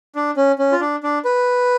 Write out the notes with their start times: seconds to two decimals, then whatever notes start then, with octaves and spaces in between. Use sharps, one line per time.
0.15 D4
0.37 C#4
0.59 C#4
0.72 F4
0.81 D4
1.03 D4
1.25 B4